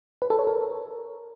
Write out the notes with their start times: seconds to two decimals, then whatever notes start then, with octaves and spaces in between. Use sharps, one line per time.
0.22 B4
0.30 A4
0.39 C#5
0.47 A#4